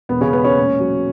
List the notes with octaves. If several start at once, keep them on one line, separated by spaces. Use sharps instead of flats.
E1 B3
C#3 C#4
G#3 B3 B4
C#4 C#5
A#2
F#3